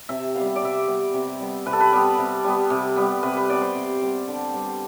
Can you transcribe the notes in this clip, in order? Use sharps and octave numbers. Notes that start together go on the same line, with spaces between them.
C3 E5
G3 B3 F5
E5
D5
C3 E5
G3 B3
C3
G3 B3
C3 B4
A4
B4
G3 B3
C3
G3 B3
C3
G3 B3
C3 B4
B4
G3 B3 D5
C5
C3
G3 B3
D3
G3 B3